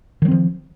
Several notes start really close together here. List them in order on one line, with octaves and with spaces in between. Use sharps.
D#3 F#3 C4 F3